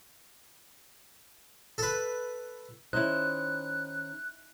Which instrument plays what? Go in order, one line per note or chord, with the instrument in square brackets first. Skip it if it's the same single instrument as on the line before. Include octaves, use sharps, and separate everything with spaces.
[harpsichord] A4 B4
[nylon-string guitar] D#3 C#4 C5 [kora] D#4 E4 [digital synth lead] F#6